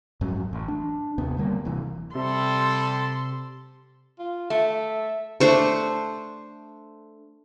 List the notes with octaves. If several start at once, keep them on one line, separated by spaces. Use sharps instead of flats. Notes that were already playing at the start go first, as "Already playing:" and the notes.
F2 G#2 F#3 C#4
A1
D4
D#2 C3 B3
D3 G3 A#3
D1 C3 E3
C3 G3 A4 C6
F4
A3 E5
A3 D4 C5 C#6